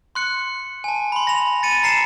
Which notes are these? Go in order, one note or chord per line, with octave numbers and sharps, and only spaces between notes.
C6 F#6 C#7
G#5 A5
B5 C6
A#6 F7
A6 C#7 D#7
A#5 C7 C#7 E7